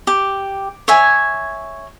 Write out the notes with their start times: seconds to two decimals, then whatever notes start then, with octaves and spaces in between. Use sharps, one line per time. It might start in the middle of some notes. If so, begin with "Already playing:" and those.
0.07 G4
0.88 C#5 E5 G#5